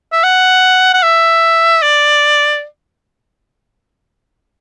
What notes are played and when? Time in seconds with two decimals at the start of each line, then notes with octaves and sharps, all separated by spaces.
0.12 E5
0.24 F#5
0.94 F#5
1.03 E5
1.82 D5